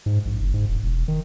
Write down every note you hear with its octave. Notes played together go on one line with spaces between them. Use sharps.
G#2
A#1
F#1
G#2
E1
E1
E1
D#3